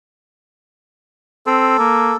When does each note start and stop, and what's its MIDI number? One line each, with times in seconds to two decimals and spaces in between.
1.46 1.74 60
1.46 2.17 69
1.78 2.14 58